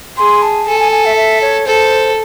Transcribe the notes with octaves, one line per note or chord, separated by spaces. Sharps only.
G#4 C6
A5
A4 G#5
G#5
G#5
E5
E5
C#5
A4 C5